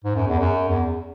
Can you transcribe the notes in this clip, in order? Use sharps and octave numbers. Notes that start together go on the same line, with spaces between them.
G#2
F#2
E2
F#2
E2